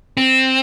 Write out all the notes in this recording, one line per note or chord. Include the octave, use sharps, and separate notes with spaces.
C4